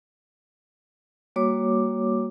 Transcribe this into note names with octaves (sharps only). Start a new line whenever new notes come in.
G3 A#3 F#4 C#5 D6